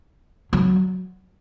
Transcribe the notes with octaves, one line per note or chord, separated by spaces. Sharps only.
F#3